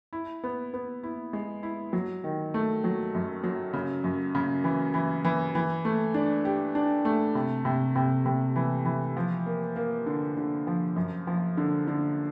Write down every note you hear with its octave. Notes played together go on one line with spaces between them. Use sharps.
E4
B3
B3
E4
G#3
E4
F#3
D#3
A3
F#3
F#2
F#3
C#3
F#2
C#3
E3
E3
E3
E3
A3
D4
G4
D4
A3
C3
C3
C3
C3
E3
E3
F3
A#3
A#3
D3
D3
F3
F#2
F3
D3
D3